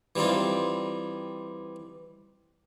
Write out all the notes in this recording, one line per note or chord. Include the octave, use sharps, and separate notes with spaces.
E3 G3 C4 D#4 F4